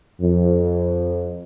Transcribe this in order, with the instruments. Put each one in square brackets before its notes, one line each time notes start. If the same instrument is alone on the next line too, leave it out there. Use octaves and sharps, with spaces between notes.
[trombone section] F2